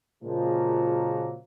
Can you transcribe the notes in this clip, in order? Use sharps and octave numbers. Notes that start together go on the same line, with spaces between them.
A#2 C#3 F3 F#3 G#3 A#3